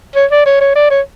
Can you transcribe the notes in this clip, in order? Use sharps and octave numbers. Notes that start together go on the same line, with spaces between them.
C#5
D5
C#5
C#5
D5
C#5